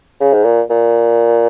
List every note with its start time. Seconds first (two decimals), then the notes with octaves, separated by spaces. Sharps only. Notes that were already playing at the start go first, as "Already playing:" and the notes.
0.21 C#3
0.33 G#2
0.44 A#2
0.70 A#2